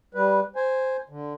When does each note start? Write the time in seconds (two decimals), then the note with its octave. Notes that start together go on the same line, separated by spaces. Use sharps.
0.15 G3 B4
0.56 C5 G#5
1.09 D3